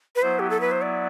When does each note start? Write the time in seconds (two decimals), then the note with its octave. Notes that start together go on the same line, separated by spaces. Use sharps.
0.16 B4
0.22 F#3 B3 E4 C5
0.39 G4
0.50 A4
0.61 B4
0.72 C5
0.82 D5